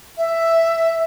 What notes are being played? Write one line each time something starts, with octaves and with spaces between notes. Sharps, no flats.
E5